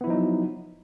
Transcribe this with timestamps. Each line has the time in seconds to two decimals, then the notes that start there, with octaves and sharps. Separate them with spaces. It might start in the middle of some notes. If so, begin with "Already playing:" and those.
0.01 B3
0.04 E4
0.07 F3
0.10 D#4
0.13 F#3